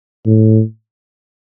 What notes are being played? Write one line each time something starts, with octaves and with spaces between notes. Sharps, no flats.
A2